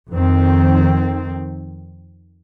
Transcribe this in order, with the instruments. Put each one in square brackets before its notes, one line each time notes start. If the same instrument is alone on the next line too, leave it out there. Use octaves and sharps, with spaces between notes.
[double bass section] F2 D#3 C4